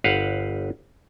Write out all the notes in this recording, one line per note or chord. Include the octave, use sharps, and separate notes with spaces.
G1 B4 C5 F5 F#5